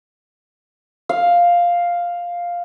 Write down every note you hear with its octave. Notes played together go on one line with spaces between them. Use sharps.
F5